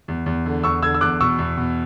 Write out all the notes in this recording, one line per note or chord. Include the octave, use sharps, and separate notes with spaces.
E2
E2
D3
E2 C#6 E6
D3 E6 G#6
E6
E2 D6 F#6
B2 C#6 E6
E2
B2